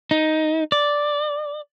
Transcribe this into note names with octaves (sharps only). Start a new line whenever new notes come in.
D#4
D5